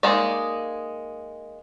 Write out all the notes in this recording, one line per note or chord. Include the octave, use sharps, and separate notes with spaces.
G#3 A#3 D#4 D5